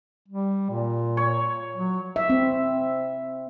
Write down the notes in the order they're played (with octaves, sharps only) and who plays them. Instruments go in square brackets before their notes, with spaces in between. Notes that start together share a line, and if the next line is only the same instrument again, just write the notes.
[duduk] G3
A#2
[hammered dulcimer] C#5
[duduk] F#3
[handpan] E5
C4